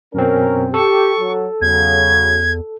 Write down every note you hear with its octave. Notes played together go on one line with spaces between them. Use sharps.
F#2 B2 C4 C#4 A#4
G4 A4 C#6
F#3
E2 C#3 F#3 G#6